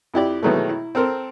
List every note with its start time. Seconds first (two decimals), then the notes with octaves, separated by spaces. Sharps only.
0.14 F2 E4 G4 D5
0.43 B2 D#3 E3 F#3 G#3 A3
0.69 E4
0.95 C4 A4 A#4 C5